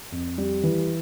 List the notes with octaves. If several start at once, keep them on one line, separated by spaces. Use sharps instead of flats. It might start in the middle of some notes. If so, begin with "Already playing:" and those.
F2
G3
E3